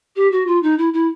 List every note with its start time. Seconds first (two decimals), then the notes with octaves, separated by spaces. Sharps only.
0.16 G4
0.32 F#4
0.47 F4
0.63 D#4
0.78 E4
0.94 E4